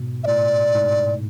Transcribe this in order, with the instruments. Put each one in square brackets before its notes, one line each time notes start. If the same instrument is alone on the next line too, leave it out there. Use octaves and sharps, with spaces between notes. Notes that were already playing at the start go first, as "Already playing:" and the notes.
Already playing: [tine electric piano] G#2 B2
[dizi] E5
[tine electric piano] A2 [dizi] D5
[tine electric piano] G#2